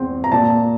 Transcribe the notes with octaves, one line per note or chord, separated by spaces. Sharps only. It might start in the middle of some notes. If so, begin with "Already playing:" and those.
Already playing: E2 C4
A#5
A#2 A5